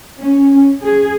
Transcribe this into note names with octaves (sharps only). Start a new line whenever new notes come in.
C#4
G#4